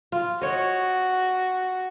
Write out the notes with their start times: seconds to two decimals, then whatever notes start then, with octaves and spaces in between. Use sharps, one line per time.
0.12 F4
0.42 F#4 C#5 D#5